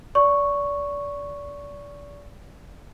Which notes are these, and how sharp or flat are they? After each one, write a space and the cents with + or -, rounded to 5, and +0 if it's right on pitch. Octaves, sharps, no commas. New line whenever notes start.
D5 -30 C#6 +0